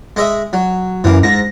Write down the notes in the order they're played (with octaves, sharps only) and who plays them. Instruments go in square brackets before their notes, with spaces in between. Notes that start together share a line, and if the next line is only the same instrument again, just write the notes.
[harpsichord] G#3 D#5 E5
F#3
[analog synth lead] F#2 [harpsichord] E3 A#3
[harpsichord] G#2 [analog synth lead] A#6